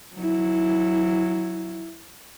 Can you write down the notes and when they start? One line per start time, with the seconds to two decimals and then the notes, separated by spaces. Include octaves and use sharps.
0.17 F#3 E4